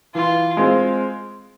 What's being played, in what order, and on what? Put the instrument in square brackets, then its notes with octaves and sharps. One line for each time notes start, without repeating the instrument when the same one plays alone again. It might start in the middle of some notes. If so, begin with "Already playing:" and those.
[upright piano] E3 [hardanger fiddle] F4
[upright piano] G#3 C4 F4